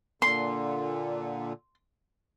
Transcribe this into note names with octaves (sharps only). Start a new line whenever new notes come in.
A#2 D3 C6